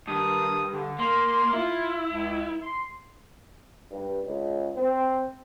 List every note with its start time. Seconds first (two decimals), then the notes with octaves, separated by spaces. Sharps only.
0.08 G2 D#3 A5 D#6
0.72 D3
0.99 A#3 C6
1.53 E4 F4
2.11 C#2
2.63 C6
3.91 G2
4.24 C#2
4.75 C4